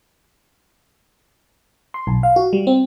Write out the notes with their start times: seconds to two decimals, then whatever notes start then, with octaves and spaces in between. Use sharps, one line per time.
1.94 C6
2.07 B1
2.23 F5
2.36 F#4
2.53 G3
2.67 C4